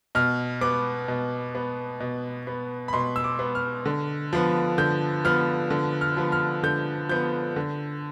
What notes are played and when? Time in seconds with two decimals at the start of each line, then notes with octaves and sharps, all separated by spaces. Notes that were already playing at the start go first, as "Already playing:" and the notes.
0.15 B2 F6
0.61 B3 D6
1.08 B2
1.55 B3
2.00 B2
2.47 B3
2.88 B5
2.93 B2 C6
3.16 E6
3.24 D6
3.39 B3
3.55 F6
3.86 D3
4.33 F3 B3
4.78 D3 G6
5.25 F3 B3 F6
5.70 D3
6.01 F6
6.17 F3 B3
6.32 F6
6.63 D3 G6
7.09 F3 B3 G6
7.56 D3